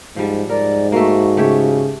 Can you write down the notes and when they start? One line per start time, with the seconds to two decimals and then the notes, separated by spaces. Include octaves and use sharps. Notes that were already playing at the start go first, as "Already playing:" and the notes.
0.16 G#2 F3 G3
0.50 G#2 A#4 D5
0.92 A3 A#3 F#4
1.37 C#3 A3 G4 C#5